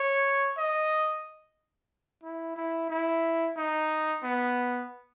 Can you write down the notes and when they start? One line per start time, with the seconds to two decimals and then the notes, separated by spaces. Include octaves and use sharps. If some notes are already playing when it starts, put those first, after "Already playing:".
Already playing: C#5
0.58 D#5
2.23 E4
2.57 E4
2.90 E4
3.57 D#4
4.23 B3